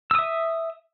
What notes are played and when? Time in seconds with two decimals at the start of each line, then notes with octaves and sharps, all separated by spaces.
0.11 E6
0.15 D#6
0.19 E5